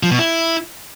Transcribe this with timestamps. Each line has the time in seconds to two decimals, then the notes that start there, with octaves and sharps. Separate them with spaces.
0.03 F3
0.11 B2
0.19 E4